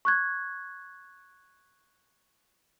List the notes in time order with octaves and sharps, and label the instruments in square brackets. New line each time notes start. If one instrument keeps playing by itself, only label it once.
[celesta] C#6 F#6 G#6